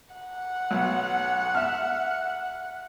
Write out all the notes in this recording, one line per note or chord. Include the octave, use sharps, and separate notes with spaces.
F#5
B1
E5 F6